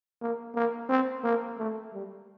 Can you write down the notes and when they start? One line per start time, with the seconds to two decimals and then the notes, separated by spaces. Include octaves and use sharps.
0.21 A#3
0.55 A#3
0.89 C4
1.24 A#3
1.58 A3
1.93 G3